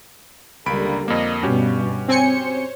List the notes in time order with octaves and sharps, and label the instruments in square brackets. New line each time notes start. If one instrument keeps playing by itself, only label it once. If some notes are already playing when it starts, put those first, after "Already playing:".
[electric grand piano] C#2 B5 D7 [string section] D3 G3 A#3
[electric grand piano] F2 A#3 [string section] D#5
[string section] G2 B2 [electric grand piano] C#4 F#4 G4
[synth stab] C4 G#5 C#7 [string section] C5 C#5